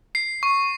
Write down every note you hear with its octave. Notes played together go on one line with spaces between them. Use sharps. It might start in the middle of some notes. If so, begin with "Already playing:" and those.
C7
C#6